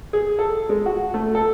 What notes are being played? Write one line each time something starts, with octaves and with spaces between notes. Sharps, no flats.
G#4
A4
G#3
F#4
A3
A4